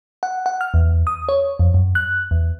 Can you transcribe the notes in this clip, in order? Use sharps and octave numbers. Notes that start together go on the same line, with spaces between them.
F#5
F#5
F6
E2
D#6
C#5
F2
F#2
F#6
E2